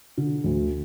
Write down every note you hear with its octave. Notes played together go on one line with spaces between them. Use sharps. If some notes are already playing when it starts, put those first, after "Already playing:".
D3
D2